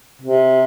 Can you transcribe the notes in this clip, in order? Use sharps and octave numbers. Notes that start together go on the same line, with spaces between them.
C3